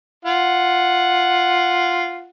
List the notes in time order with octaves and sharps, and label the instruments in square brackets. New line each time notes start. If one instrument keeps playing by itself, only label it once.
[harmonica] F4 F#5